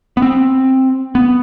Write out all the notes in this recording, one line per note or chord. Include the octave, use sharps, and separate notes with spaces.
B3
C4
B3